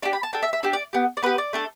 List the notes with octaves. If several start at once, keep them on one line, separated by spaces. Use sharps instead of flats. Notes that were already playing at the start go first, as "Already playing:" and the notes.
D4 G4 D5
B5
A5
D4 A4 G5
E5
E5
D4 G4 E5
D5
B3 G4
D5
B3 G4 B4
D5
A3 D4 A4